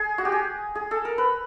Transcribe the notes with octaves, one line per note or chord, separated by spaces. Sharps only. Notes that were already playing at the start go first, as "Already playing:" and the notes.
Already playing: G#4
F#4
G4
G#4
G#4
A4
A#4
B4